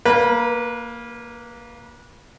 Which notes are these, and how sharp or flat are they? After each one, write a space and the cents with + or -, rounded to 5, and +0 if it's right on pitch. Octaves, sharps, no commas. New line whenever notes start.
A#3 +0 B4 -30